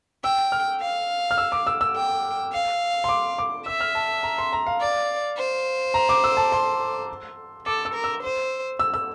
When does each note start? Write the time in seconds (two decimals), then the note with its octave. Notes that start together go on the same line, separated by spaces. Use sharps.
0.24 G5 E6
0.52 F6
0.81 F5
1.31 F6
1.38 E6
1.52 D6
1.67 E6
1.81 E6
1.96 G5
2.53 F5
3.04 C6
3.09 D6
3.38 D6
3.66 E5 E6
3.81 F6
3.95 A5
4.23 A#5
4.38 C6
4.53 A#5
4.66 F5
4.81 D5
5.37 C5
5.94 A#5
6.09 D6
6.24 E6
6.37 A5
6.52 C6
7.66 A4 D6
7.85 E6
7.94 A#4
8.04 E6
8.23 C5
8.79 E6
8.94 E6